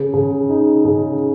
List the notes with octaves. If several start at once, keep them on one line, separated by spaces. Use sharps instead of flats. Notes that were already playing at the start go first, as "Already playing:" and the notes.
Already playing: C#3
C#3
D#4
C#3